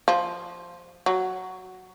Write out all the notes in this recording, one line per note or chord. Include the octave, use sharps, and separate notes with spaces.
F3
F#3